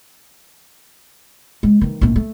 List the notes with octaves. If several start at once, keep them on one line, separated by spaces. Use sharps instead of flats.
G#3
D#3 E3
A#1 A2
A3